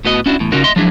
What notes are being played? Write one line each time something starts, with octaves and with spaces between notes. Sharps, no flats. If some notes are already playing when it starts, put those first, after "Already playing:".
A2 B3 F#4 D#5
C#4 D4 E4 F#4
E2 A2
C#3 C#4 D#4 F4 F#4 A#4
D#5 E5 C6
F3 F#3 G#3 D4 E4